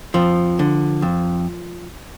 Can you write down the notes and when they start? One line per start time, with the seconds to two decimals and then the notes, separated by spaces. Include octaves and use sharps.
0.14 F2 F3
0.59 D3
1.02 F2